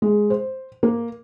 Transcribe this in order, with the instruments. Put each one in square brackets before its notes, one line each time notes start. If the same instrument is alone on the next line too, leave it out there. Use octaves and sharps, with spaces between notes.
[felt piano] G#3
C5
A#3